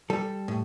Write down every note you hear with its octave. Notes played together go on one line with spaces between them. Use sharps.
G3 A4
A2